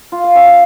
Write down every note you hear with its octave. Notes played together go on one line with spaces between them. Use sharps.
F4
F5
C#4 E5
F5